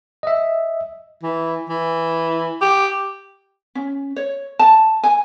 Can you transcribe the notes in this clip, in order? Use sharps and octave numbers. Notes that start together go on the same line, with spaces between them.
D#5 E5
E3
E3
G4
C#4
C#5
A5
G#5